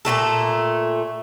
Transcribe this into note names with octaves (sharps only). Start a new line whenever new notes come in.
A#2 C#3 A3 A4